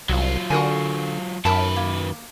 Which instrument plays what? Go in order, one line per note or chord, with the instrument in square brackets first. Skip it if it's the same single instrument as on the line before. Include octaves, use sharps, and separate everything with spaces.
[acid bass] C2 [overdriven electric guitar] F#3 F4
[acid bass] D3 [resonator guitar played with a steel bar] F#4 A#4 G#5
[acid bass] F#2 [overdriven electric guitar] D#3 B4 [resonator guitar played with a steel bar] A#4 E5 A5
[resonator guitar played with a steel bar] A#3